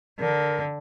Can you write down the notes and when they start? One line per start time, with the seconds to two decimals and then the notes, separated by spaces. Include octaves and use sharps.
0.19 D3 A#4